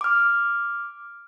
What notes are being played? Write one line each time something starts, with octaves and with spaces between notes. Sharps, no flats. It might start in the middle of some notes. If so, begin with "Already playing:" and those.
D6 F6